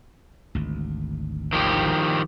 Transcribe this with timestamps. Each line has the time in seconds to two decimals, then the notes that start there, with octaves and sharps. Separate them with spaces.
0.55 G#1 D2
1.53 D#3 F3 G4